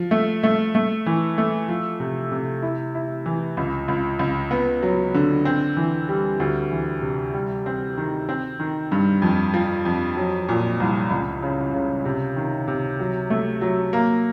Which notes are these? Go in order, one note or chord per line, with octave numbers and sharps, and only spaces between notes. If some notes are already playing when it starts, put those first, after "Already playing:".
Already playing: F3
A3
A3
A3
E3
A3
F3
C3
C3
E4
E4
E3
C#2
C#2
C#2
B3
F#3
D3
C4
E3
G3
D2
E3
C3
G3
C4
D#3
C4
D#3
G2
F2
F3
F2
F#3
A#2
C2
C#2
C#3
C#3
C3
D#3
C3
F#3
A3
F#3
A#3